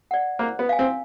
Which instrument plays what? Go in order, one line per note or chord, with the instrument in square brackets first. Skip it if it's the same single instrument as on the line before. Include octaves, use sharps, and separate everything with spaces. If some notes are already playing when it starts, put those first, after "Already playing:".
[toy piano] D5 F#5
[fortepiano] A#3 [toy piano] C5
[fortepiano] B3
[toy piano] F5 G#5
[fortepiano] C4